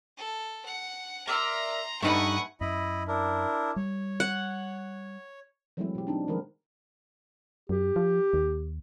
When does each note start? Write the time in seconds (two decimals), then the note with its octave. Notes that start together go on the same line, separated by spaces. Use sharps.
0.18 A4
0.66 F#5
1.27 A#4 D5 E5 A#5 C6
2.02 G2 A3 D#4 B4 F#5 G#5 B5
2.61 F#2 E4 D#5 B5
3.08 D4 E4 A#4
3.76 G3 C#5
4.20 F#5
5.77 E3 F#3 G#3 A3 C4 E4
5.95 B2 G4
6.07 C4 D4 D#4
6.28 D#3 F3 G#3 A3 A#4 B4
7.69 F#2 G4
7.96 F3
8.33 D#2